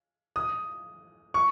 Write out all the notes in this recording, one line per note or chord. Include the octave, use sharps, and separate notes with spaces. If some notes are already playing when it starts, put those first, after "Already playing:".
D#6
C#6